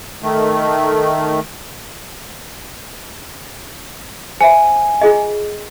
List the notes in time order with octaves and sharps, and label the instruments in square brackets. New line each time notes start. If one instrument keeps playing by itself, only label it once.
[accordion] D#3 A3
[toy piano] C5 E5 [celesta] G#5
[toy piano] F4 G#4 D#5